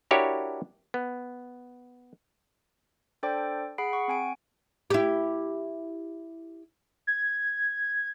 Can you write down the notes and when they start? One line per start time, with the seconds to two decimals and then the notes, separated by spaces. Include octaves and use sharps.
0.11 D4 E4 F#4 G4 A#4 C#5
0.94 B3
3.23 D4 A4 C5 D5 G5 D6
3.78 G#4 F#5 B5 C7 D7
3.93 F#5 C#6
4.08 C4 G#5 D7
4.90 E4 G4
7.07 G#6